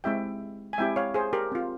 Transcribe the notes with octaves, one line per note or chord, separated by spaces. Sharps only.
G#3 C4 E4 G4 E5 G5
G#5
G#3 C4 E4 G4 E5 G5
C#5 F5
G#4 C5
G4 A#4
C4 F4